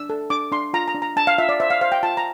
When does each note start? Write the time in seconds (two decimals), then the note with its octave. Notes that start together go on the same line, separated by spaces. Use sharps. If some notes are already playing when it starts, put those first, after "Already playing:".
Already playing: D4 E6
0.10 A4
0.30 D4 D6
0.52 D4 C6
0.73 F4 A#5
0.88 A#5
0.94 D4
1.02 A#5
1.16 D4 A5
1.27 F5
1.38 F4 E5
1.49 D5
1.60 C5 E5
1.70 F5
1.81 C5 F5
1.92 G5
2.03 F4 A5
2.17 A#5